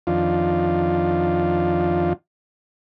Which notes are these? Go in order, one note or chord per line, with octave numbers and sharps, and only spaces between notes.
F2 D#3 F3 D4 F4